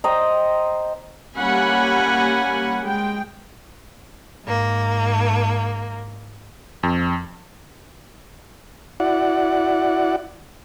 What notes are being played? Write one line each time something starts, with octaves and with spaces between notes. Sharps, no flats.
C5 D#5 G5 A#5
G3 A#3 C#4 F#5 G#5 B5
G#3 G5
G#2 A#3
F2
E4 F#4 D5 F#5